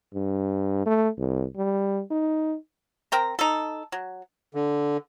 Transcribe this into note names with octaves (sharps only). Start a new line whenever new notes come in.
G2
A3
C2
G3
D#4
C4 A#4 G5 A#5
D#4 A4
F#3
D3